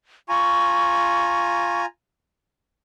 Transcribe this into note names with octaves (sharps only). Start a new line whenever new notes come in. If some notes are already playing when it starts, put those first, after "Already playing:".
F4 G#5 A#5 C#6